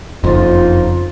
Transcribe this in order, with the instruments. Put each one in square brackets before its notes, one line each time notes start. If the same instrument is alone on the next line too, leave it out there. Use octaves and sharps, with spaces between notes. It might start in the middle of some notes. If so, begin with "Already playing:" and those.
[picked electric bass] F#1 F2 [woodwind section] F3 D#4 F4